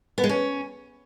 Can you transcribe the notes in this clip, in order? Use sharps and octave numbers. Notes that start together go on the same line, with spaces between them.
B3
G#3
C#4